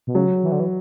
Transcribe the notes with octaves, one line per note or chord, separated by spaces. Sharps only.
B2
C#3 F#3
E3
D3
E3